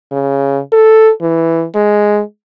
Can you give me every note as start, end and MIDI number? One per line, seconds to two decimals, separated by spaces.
0.12 0.59 49
0.72 1.11 69
1.21 1.64 52
1.75 2.21 56